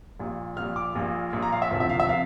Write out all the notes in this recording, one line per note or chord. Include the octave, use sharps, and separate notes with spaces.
A#1 A#2 G3
A#1 A#2 G3 F6
D6
A#1 A#2 G3
A#1 A#2 G3
A#5
F5
E5
E1 D2 C3 F3
E5
F5
E5
C3 F3 F5